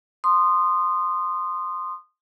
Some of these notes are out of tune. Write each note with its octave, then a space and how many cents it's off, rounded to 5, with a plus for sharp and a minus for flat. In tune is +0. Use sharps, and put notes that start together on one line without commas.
C6 +0 D#6 -20